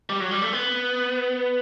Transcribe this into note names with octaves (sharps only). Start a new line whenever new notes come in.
G3
F#3
G3
A3
B3